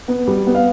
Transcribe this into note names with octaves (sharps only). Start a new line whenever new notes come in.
B3
G3
B3
F5